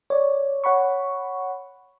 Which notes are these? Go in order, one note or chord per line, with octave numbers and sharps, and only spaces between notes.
C#5 D5
C#5 F#5 B5 C#6